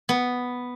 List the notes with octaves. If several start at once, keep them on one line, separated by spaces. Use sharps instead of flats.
B3